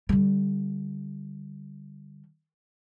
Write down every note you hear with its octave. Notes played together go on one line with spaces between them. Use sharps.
D3 G3